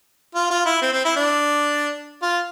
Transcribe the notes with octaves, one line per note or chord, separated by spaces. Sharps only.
F4
F4
E4
C4
C4
E4
D4
F4